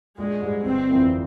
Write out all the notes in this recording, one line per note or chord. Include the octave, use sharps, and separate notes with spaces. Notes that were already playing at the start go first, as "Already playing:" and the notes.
A#1 G#3
G#2 G3
G1 C4
F2 E3 A#3